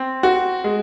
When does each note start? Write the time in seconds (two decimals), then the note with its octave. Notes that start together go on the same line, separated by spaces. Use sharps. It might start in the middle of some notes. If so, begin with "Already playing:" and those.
Already playing: C4
0.23 F#4
0.64 G#3